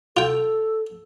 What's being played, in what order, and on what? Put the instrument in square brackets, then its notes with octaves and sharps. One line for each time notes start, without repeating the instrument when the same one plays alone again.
[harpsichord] F4 G5 [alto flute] A4